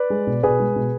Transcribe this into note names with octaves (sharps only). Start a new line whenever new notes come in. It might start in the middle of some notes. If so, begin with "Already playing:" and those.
Already playing: B4 D5
G#3
B2
B2 G#4 B4
G#3
B2